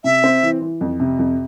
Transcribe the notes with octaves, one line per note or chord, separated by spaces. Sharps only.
C3 E5
C4
E3
E3
F2
C3
F2